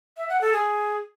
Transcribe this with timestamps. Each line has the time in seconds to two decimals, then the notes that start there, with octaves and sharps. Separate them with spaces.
0.17 E5
0.29 F#5
0.41 A4
0.53 G#4